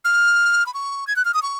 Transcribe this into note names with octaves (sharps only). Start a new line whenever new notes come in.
F6
B5
C#6
G#6
F#6
F6
D#6
C#6